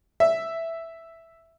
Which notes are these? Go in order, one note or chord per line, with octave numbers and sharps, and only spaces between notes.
E5